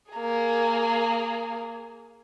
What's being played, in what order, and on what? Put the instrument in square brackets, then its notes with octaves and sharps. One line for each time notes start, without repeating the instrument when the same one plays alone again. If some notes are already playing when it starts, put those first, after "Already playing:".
[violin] A#3 G#4